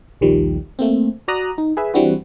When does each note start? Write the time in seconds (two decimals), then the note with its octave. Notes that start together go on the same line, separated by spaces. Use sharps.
0.21 A#1 D#2 D#3 F3 G3
0.79 A3 A#3 C4
1.28 F#4 D5 A#5 D#6 F#6
1.58 D#4
1.77 G#4 B4 E5
1.94 E3 G3 C4 D4 F#4 B4